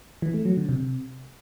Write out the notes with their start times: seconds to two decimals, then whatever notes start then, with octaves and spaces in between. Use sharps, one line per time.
0.22 E3
0.34 A3
0.46 F#3
0.57 D3
0.69 C3